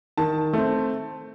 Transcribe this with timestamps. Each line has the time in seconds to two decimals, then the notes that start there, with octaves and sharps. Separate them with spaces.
0.18 D#3 A5
0.53 A3 C4